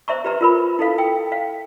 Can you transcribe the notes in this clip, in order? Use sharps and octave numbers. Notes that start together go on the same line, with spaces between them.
C5 E5 A#5 C#6
G4 B4 A#5
F4 A#4 B5
E4 A4 F5
G5
F5